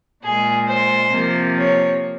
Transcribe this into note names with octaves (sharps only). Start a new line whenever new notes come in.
A#2 G#3 G#4
C5
C3 F3 A#3
C#5